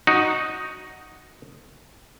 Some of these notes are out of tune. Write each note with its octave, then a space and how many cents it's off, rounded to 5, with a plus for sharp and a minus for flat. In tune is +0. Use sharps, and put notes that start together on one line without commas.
D#4 +0 F#4 +0